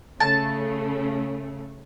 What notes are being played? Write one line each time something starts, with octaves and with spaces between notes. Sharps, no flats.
C#3 A3 A5